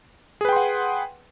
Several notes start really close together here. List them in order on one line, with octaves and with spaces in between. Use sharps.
G#4 B4 G5 C6 F#5